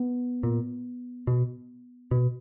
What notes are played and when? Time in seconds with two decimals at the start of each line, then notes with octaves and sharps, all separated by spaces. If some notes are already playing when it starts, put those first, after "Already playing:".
Already playing: B3
0.43 A#2
1.27 B2
2.11 B2